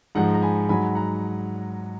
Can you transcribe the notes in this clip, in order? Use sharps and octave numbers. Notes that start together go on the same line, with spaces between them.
G#2 F3 G#3 F#5 A#5
A#5
G#5 B5
G#2 F#3 G#5 B5
F#5 A#5